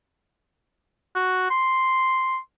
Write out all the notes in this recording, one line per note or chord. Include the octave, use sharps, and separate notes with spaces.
F#4
C6